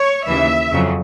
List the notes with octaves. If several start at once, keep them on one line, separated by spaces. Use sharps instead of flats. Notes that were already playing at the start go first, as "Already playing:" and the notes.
Already playing: C#5
D#2 C#3 E3 E5
F2 C#3 F#3